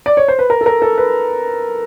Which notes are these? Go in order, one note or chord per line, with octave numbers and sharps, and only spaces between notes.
D5
C#5
C5
B4
A#4
A4
A#4
A4
B4